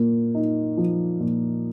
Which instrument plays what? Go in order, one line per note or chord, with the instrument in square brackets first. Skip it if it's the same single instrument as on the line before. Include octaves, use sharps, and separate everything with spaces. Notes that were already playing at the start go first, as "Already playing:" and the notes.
Already playing: [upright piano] A#2 A#3
D#4
F3
A#2